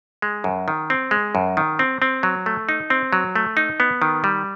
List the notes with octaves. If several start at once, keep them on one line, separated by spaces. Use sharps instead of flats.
G#3
F#2
D#3
C4
G#3
F#2
D#3
C4
C4
F#3
A3
D#4
C4
F#3
A3
D#4
B3
D#3
G3